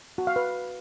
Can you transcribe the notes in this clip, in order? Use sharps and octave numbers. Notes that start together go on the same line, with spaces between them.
F#4
F5
B4